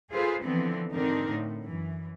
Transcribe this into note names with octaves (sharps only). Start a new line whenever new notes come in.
F4 G#4 A4 B4 C5
D3 E3 F3 B3 C4
G#2 D3 C4 D4 D#4 A#4
A2
F#2 E3